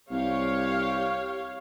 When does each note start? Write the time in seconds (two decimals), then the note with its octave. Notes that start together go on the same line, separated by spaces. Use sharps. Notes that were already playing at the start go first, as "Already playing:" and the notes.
0.11 C2 G4 C#5 F5